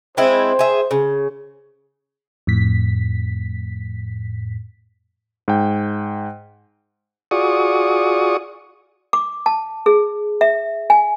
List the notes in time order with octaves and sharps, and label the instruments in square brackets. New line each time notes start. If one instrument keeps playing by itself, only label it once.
[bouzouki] G#3 C4 E4 [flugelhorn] C5
[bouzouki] G#4 E5
C#3
[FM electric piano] F2 A2 B6
[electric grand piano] G#2 G5
[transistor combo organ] F4 F#4 G#4 D5 C#6 D#6
[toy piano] D6
A5
G#4
E5
G#5